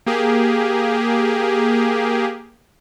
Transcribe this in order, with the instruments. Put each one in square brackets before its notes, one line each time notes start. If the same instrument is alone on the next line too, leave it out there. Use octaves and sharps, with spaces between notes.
[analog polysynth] A#3 G4 G#4